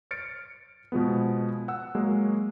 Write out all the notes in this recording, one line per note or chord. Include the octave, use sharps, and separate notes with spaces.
F6 A6 C#7 D7
B2 F3 G#3 B3
F#5 E6
F#3 G#3 A#3